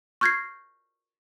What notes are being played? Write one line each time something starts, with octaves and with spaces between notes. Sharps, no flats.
C#6 F6 G6 G#6 A#6 C7